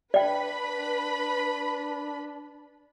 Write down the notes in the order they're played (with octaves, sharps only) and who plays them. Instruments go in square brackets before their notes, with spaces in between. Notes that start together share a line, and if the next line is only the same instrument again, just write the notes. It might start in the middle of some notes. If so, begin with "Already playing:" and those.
[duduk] D4 [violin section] B4 B5 [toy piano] D5 G5